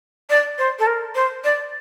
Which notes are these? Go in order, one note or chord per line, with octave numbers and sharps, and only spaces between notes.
D5
C5
A4
A#4
C5
D5